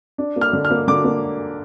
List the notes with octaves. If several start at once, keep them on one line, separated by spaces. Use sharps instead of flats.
D4
A#3
F6
D3
F6
A#3
D3 D6
A#3